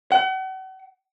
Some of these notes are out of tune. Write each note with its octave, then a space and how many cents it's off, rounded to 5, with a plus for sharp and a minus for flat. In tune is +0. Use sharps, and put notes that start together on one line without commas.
F#5 +40